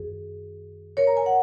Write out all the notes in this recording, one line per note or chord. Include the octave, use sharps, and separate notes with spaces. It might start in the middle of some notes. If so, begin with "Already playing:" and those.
Already playing: F#2 D#3 G#4
A#4 C#5
A#5
G#5
F#5